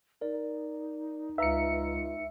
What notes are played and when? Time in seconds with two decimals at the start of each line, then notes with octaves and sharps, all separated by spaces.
0.21 D#4 A#4 D5
1.38 C#2 B4 E5 F5 A#5 C#7